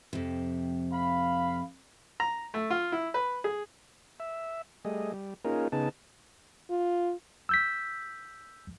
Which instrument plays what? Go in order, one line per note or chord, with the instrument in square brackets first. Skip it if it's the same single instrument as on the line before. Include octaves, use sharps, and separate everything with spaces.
[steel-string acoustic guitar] F2 C3
[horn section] F5 B5
[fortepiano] A#5
A3
F4
E4
B4
G#4
[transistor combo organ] E5
G3 A3 G#4 D#5
G3
A#3 C#4 D#4 F4 G#4 A#4
C#3 B3 D#4 G#4 A5
[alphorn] F4
[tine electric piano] E6 G6 B6